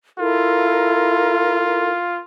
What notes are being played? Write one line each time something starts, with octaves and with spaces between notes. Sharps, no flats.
E4 F4 A4 A#4